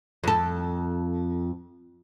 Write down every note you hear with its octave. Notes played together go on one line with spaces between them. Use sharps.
F2 A4